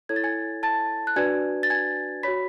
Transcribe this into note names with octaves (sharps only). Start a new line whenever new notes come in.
E4 A4 C#5 G#6
A6
G#5 G#6
A5 A6
F#6
D4 F#4 B4 D5 G#5 G#6
A6
G#5 G#6
F#4 C#5 B5 B6